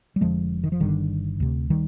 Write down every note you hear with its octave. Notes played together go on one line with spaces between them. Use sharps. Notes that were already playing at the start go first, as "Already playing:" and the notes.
G3
F1 F2 D3 F3 G#3
D#3
F3
G1 G2 D3 D#3 G3
D2 C3
D#3 G3